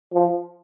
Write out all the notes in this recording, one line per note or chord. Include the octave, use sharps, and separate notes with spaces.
F3